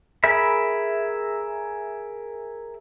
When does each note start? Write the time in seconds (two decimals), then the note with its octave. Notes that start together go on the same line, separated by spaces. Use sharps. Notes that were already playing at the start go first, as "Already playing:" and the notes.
0.24 G#4 A#4 E5 B5